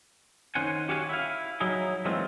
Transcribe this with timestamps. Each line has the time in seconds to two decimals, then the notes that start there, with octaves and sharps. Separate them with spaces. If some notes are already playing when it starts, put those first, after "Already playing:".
0.55 D#3 C#4 C5 F#5 G#5
0.89 F#4 G4 C#5 F5 F#5 G#5
1.09 E4 F5
1.60 F#3 D#4 E4 G#4
2.05 E3 F#3 G#3 A3 C4 F4